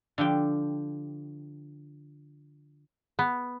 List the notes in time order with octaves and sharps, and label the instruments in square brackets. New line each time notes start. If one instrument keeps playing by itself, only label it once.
[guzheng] D3 F3 G4 G5
[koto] B3